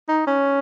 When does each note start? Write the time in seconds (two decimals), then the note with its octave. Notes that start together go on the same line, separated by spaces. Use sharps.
0.09 D#4
0.27 C#4